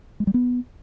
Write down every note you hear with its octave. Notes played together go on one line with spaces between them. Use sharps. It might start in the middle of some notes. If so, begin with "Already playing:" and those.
G#3
G3
B3